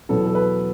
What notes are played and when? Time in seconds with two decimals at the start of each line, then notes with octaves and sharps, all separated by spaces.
0.09 E2 B2 F#3 B3 A4
0.27 A4
0.35 B4